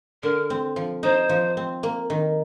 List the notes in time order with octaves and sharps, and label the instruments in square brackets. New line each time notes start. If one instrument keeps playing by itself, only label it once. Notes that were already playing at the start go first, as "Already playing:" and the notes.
[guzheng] D3 [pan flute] A#4
[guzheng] C4
F3
[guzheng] D#4 [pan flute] C5
[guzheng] F3
C4
A#3
D#3